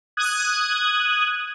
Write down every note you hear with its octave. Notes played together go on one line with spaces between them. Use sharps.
D#6 F#6 G#6